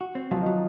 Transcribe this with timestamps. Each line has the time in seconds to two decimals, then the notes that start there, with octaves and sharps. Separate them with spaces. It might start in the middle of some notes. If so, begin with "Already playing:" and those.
0.01 F#4
0.15 C4
0.31 F3 F#3 F4
0.41 D#3 D#4
0.46 F#3